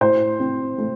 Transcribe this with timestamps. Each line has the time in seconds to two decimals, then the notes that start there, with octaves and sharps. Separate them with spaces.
0.01 A2 C5
0.40 C4
0.78 A3